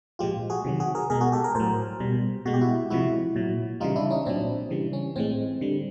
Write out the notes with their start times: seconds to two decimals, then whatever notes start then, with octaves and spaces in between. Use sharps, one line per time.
0.19 A#2 F3 G#3 F4 G4
0.50 F#4 G#4
0.65 C3 D#3 F#3
0.80 F#4 G#4
0.95 G#4 A#4
1.10 B2 G#3 G#4 A#4
1.21 F#4 G#4
1.32 G4 A4
1.44 G#4 A#4
1.55 A2 F#3 A#4 C5
2.00 B2 G3
2.45 B2 G#3 F#4
2.54 G4
2.61 E4 F#4
2.90 C3 F3 G#3 E4 F#4
3.36 A#2 F#3
3.80 C#3 E3 G3 D#4 F4
3.96 D4 E4
4.10 C#4 D#4
4.25 A#2 F#3 C4 D4
4.70 C#3 E3 G3
4.93 C#4
5.16 A2 E3 G#3 C4
5.61 D3 G3